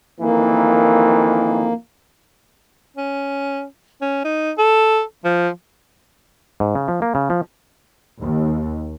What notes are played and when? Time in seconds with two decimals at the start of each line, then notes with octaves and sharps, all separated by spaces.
0.20 F2 D#3 E3 A#3
2.97 C#4
4.01 C#4
4.24 D#4
4.58 A4
5.24 F3
6.60 G#2
6.75 C#3
6.88 F3
7.02 A#3
7.15 C#3
7.30 F3
8.21 D#2